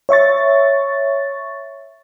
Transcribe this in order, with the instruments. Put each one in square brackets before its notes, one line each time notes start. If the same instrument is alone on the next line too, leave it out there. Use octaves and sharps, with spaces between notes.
[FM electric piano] C#5 E5 C#6 A6